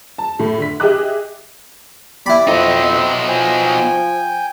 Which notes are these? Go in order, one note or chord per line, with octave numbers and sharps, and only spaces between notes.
A5
A2
D3 B6
G4 G#4 D#5 E5 D6 F#6
E4 G4 D5 B5
F2 B2 C4 D#4
F3 G5 G#5